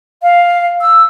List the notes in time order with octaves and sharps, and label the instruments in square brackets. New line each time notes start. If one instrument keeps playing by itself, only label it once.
[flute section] F5
E6